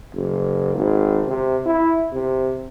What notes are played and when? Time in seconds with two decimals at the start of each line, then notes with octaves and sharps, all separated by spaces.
0.15 F#1
0.75 G#1
1.28 C3
1.66 E4
2.13 C3